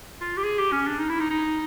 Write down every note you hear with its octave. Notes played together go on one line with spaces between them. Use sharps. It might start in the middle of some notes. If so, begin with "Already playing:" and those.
F4
G4
G#4
G4
C#4
D4
D#4
E4
D#4
D#4